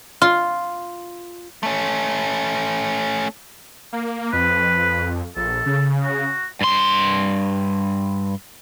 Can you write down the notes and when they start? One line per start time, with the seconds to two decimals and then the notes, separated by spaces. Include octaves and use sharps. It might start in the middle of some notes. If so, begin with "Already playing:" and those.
0.22 F4 C6
1.63 A3 C#4
3.93 A#3
4.33 F2 B4
5.36 A#1 A4
5.66 C#3
6.04 F#4
6.61 G2 C6